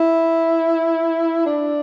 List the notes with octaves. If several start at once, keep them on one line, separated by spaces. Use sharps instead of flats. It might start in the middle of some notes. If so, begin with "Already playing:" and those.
Already playing: E4
D4